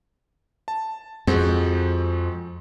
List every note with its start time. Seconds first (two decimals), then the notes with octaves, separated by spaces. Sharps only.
0.68 A5
1.27 F2 G#3 C4 F#4